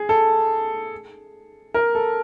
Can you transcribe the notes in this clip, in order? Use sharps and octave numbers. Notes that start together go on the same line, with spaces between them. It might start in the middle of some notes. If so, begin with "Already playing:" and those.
Already playing: G#4
A4
A#4
A4